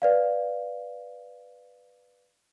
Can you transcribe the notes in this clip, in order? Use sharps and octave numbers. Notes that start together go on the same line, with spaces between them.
B4 D5 F5